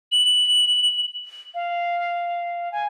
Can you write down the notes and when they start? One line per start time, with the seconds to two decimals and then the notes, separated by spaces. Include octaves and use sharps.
0.12 F#7
1.54 F5
2.72 G#5